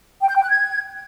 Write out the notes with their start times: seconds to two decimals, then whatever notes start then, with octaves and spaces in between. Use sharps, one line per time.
0.22 G5
0.29 G6
0.36 G5
0.43 F#6
0.50 G#6